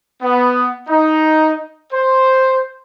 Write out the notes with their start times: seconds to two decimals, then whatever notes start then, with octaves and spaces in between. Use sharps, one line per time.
0.21 B3
0.88 D#4
1.92 C5